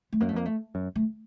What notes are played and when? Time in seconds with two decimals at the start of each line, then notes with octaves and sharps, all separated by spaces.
0.13 A3
0.20 F#2 A#3
0.29 A3
0.33 F2 A#3
0.45 A3
0.75 F#2
0.95 A3